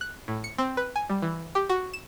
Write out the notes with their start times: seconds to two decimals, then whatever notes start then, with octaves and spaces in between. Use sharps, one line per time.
0.01 F#6
0.28 A2
0.44 C#7
0.58 C4
0.77 B4
0.96 G#5
1.09 G3
1.22 E3
1.55 G4
1.69 F#4
1.93 E7